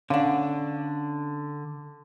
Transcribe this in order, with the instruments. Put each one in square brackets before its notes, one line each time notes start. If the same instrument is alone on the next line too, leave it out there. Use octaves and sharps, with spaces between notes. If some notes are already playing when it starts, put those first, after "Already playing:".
[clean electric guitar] D3 [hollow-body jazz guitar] C#4 D4 [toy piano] F5 F#5